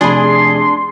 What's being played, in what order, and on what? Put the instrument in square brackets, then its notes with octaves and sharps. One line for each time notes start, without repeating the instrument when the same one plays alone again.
[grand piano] F1 C3 B5 [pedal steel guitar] D4 [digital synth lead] G#4 [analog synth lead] C6